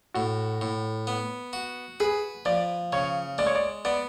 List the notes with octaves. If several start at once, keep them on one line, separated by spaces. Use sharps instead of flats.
A2 F#4
A2
B3
F#4
G#4 B4
F3 D5
C#3 C#5
G#3 D5
C#5
D5
B3 D5